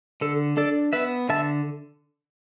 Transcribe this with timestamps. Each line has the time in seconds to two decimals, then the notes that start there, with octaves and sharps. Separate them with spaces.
0.21 D3 A4
0.57 D4 A4 D5
0.93 B3 B4 E5
1.29 D3 E5 A5